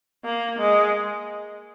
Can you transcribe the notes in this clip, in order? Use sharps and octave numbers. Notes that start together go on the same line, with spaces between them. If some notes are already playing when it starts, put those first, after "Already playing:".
A#3
G#3